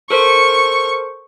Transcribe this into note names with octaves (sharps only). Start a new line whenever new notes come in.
A4 A#4 C5 C#6